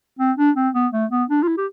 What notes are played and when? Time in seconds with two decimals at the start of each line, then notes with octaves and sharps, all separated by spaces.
0.19 C4
0.38 D4
0.56 C4
0.75 B3
0.93 A3
1.11 B3
1.30 D4
1.43 F4
1.48 E4
1.58 G4